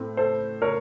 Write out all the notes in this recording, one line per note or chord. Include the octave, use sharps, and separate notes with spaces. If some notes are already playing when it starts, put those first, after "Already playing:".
Already playing: A2 A3 C4
A4 C5
A#4 C#5